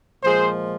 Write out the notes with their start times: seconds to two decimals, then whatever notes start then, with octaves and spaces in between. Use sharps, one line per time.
0.23 A#2 F3 G#3 G#4 C5